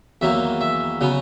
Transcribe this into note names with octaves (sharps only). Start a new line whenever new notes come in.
E2 D#3 F#3 A#3 E5
E5
C#3 F#3 B3